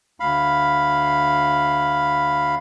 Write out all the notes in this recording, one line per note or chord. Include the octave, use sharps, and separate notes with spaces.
D2 F5 B5